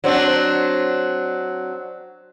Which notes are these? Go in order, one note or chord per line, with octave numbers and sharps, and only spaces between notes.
F#3 C4 D4